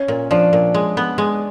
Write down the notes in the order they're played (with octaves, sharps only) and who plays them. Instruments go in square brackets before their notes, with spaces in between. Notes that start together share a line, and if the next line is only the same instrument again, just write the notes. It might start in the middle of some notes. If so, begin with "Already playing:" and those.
Already playing: [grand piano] C#4 C#5
[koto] A#2
[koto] F3 [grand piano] D4 D5
[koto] A#2
G#3
B3
G#3